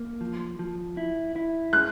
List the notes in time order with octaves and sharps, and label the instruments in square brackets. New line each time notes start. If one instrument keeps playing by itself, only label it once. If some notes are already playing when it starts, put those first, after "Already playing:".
Already playing: [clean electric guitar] A#3
F3
F3
E4
E4
[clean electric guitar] G#3 [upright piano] F#6